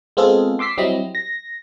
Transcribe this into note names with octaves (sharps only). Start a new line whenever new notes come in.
G#3 B3 C4 F4 G#4 A4
C6 D6 E6 B6 C7
F#3 G3 C4 E4 D#5
A#6